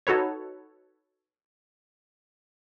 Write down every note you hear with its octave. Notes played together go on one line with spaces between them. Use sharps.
D#4 F#4 A4 B4 C#5